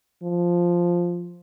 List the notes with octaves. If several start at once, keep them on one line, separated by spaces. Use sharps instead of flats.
F3